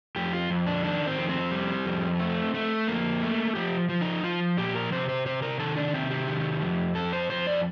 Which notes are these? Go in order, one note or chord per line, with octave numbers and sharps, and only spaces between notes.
F2 G4
F4
F2
D4
D#3 D4
C4
F2
C4
G3
F2
A3
A3
F2 A#3
A3
F3 G4
F3
D#4
F3 F4
A#2 G4
A#4
C3 C5
C5
C3 C5
A#4
D#3 A4
D4
C3 C4
G4
D#3
F2
F2 A4
C5
F2 C5
D5